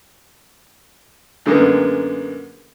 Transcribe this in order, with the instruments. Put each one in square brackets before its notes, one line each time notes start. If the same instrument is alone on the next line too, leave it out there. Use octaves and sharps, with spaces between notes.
[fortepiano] F#2 D3 G#3 A#3 B3